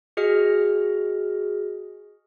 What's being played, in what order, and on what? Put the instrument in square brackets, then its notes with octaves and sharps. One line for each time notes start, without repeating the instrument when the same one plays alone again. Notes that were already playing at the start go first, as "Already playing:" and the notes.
[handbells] F#4 G#4 D#5 F6